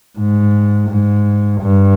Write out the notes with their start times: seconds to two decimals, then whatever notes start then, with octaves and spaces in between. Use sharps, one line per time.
0.18 G#2
0.90 G#2
1.62 G2